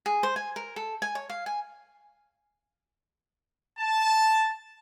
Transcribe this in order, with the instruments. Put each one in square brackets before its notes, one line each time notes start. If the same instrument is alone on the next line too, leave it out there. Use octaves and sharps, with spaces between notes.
[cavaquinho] G#4
C5
G#5
A#4
A4
G#5
C#5
F5
G#5
[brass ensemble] A5